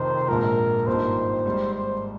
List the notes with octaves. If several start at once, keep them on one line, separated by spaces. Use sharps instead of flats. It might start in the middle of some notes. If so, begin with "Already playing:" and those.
Already playing: F1 F2 C3 D#3 C5
A#1 G#2 F3 A#4
G#1 G2 F3 A#3 D#4 C5
G#1 G#2 G3
C5